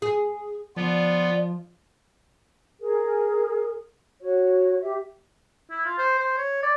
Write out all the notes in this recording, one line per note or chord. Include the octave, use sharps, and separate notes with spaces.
G#4
D3 F3 B3 D4 F4
G#4 A#4
F#4 C#5
G4 E5
E4
F4
C5
C5
C#5
D5